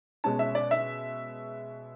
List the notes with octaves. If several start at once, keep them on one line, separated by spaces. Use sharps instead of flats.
B2 G#3 C#4 A5
E5
D5
E5